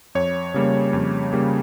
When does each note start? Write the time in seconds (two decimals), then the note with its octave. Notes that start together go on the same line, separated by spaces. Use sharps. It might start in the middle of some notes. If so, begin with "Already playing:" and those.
0.15 F2 C#5
0.54 C#3 G3 A#3
0.93 F2
1.33 C#3 G3 A#3